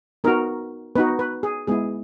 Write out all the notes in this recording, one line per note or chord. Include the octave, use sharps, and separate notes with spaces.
B3 D#4 F#4 A#4
B3 D#4 F#4 B4
B4
G#4
G#3 B3 E4 G#4